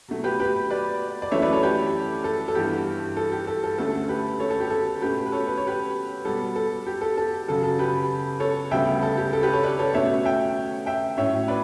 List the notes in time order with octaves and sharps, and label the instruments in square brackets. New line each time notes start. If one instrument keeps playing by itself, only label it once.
[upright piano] B2 F#3 A3
G4 B4
G4 B4
B4 D5
D5
F#2 E3 A3 C#4 C#5 E5
B4 D5
A4 C#5
G4 B4
A4
A4
G2 E3 B3 G4
A4
G4
A4
A4
D2 D3 A3 C#4 A4
G4 B4
A4 C#5
A4
G4
A4
B2 A3 C#4 G4 B4
B4
A4 C#5
B4
C#5
G4 B4
B2 G3 B3 A4
A4
G4
A4
A4
F#2 C#3 F#3 A4
A4
G4 B4
A4 C#5
D2 C#3 G3 B3 E5 G5
A4
G4
A4
G4 B4
A4 C#5
B4 D5
A4 C#5
B2 A3 C#4 C#5 E5
E5 G5
E5 G5
A2 F#3 C#4 C#5 E5
B4 D5